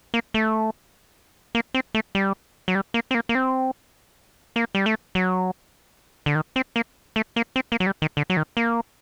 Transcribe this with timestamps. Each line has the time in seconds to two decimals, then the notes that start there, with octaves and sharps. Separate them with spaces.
0.14 A#3
0.34 A3
1.55 A#3
1.74 C4
1.95 A3
2.15 G3
2.68 F#3
2.75 G3
2.94 A#3
3.11 C4
3.15 A#3
3.29 A#3
3.35 C4
4.56 A#3
4.75 G3
4.86 A3
5.15 F#3
6.26 D3
6.35 D#3
6.56 C4
6.76 A#3
7.16 A3
7.36 A#3
7.56 C4
7.72 A#3
7.80 F#3
7.87 G3
8.02 D#3
8.17 D3
8.30 F#3
8.37 D#3
8.57 A#3